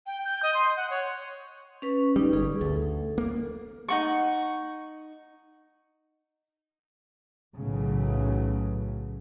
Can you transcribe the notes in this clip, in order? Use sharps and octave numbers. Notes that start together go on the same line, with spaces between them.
G5
G6
D#5
C6
F#5
C#5
C#4 B4 C#6
G3 D#4
G1 G#4
D2 A4
A#3
D#4 F#5 C#6
B1 A2 C#3 E3 F#3 A3